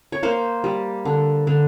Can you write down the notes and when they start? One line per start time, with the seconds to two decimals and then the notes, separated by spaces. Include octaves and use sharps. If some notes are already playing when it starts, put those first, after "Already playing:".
0.12 C#5
0.23 A#3 C5
0.64 G3
1.05 D3
1.47 D3